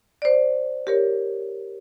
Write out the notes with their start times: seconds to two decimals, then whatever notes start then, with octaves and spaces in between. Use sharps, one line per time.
0.22 C5 D5
0.87 G4 A#4 C#5